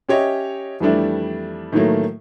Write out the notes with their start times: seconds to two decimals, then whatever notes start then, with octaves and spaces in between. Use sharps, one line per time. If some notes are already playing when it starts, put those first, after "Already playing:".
0.09 C#4 G4 C#5 D#5 E5
0.80 F2 E3 G3 A3 D4 E4
1.72 A2 D#3 E3 F#3 A3 A#3